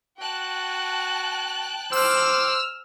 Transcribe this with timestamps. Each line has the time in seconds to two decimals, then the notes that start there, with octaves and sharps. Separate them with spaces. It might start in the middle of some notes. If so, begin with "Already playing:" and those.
0.20 F#4 G5 A5 F#6
1.92 C5 D6 E6 F6